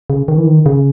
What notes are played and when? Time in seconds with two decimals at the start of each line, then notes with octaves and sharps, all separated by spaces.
0.10 C#3
0.28 D#3
0.38 E3
0.46 D#3
0.66 C#3